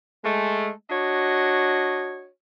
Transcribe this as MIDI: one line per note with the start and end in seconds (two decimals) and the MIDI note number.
0.24 0.70 56
0.24 0.70 57
0.91 2.28 62
0.91 2.28 66
0.91 2.28 73
0.91 2.28 75